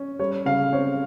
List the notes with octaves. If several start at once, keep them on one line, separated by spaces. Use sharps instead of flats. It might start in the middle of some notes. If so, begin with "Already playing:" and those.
Already playing: C#4
G3 C#5
C#3 F5
C4 C#5